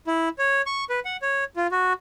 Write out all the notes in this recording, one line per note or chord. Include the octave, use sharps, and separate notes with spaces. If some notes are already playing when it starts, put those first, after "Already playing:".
E4
C#5
C#6
B4
F#5
C#5
F4
F#4